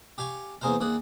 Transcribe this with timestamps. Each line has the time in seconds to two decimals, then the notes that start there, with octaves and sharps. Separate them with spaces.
0.18 G4 F5 G#5 C#6
0.61 E2 A#3 G#4 A#4 C5 F5
0.80 D#2 A#3 G#4 F#5